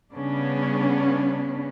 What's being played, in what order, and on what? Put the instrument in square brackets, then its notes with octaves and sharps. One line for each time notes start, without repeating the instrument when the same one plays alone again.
[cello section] C#3 G3 B3 C#4 D4